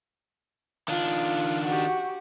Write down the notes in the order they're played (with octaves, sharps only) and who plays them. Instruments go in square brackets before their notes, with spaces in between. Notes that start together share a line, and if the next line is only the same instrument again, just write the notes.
[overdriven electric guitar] D#3 D4 [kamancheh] F4
[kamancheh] F#4 G4